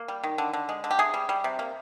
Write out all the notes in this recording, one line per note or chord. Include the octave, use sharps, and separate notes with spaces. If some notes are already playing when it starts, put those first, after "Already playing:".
Already playing: A#3
G3
D#3
D3
D3
G#3
D3
G4
C3 G#4
G3
G3
C3
A#3